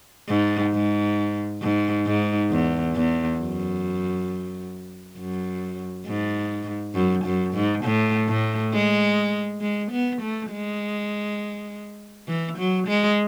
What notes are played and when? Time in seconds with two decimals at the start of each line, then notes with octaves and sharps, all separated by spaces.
0.29 G#2
0.74 G#2
1.62 G#2
2.06 G#2
2.51 E2
2.96 E2
3.39 F#2
5.17 F#2
6.06 G#2
6.95 F#2
7.25 F#2
7.54 G#2
7.85 A2
8.28 A2
8.73 G#3
9.61 G#3
9.91 B3
10.22 A3
10.51 G#3
12.28 E3
12.58 F#3
12.88 G#3